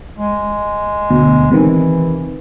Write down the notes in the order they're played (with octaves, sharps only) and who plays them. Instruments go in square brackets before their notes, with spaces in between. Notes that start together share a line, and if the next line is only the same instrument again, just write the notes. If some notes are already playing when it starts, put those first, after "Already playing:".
[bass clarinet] G#3
[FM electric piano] D2 B2
[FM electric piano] C3 D#3 [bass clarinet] E3